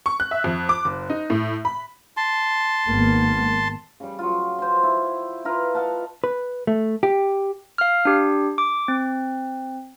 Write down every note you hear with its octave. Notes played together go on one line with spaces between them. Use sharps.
C#6
F#6
E5
F2
D6
F#1
D#4
A2
B5
A5 C6
G#1 A#3 B3
C#3 G3
F#3 F4
C5 C6
E4
E4 F4 A#4 B4
D#5 F5 F#5 A5
B4
A3
G4
F5 F6
D4 G4
D6
C4